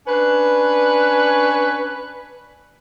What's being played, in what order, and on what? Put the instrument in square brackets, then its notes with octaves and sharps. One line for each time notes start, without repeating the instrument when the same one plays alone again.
[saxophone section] C#4 D4 B4